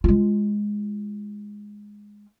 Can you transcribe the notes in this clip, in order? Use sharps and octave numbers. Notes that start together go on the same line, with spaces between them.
G#3 F4